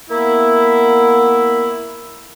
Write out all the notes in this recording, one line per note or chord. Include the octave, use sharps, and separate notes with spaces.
A#3 B3 E4